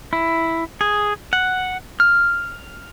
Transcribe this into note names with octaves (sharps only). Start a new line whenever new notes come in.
E4
G#4
F#5
F6